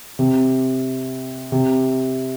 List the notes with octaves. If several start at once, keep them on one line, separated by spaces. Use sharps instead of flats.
C3
C3